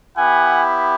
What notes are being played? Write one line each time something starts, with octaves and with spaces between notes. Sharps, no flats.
B3 E4 G4 F#5 G#5